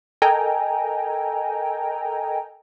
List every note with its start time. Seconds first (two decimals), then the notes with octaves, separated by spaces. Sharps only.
0.22 A4 A#4 D#5 G5 G#5 A#5